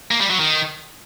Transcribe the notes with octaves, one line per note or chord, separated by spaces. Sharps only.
A#3
G3
F#3
D#3